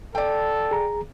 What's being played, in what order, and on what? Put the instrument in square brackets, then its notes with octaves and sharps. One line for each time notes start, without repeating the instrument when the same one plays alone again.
[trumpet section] A4 [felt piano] D5 G5
[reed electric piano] G#4 A#5